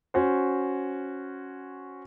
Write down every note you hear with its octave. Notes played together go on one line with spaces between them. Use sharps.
C#4 F#4 C5